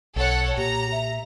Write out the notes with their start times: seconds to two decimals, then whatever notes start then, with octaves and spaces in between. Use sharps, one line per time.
0.16 B1 A4 C#5 F#5
0.57 A#2 G4 A#5
0.92 E5